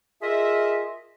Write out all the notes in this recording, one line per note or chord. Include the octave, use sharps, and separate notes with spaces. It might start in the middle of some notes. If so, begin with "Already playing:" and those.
F4 G#4 A#4 D#5 E5